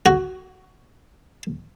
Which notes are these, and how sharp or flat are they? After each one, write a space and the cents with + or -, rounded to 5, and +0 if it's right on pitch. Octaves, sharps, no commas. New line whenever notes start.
F#4 +10